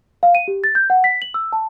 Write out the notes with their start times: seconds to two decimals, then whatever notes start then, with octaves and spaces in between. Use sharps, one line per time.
0.23 F5
0.35 D#7
0.48 G4
0.64 A6
0.75 G6
0.90 F#5
1.04 B6
1.22 F#7
1.34 E6
1.53 A5